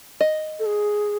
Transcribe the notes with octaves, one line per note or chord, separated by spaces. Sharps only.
D#5
A4
G#4